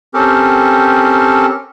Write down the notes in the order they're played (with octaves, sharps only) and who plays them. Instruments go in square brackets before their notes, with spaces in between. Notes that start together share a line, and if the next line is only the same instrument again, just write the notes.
[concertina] C4 C#4 G4 A4 A#4